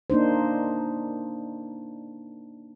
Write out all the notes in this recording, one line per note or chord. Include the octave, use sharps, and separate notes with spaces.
A#3 D4 D#4 C5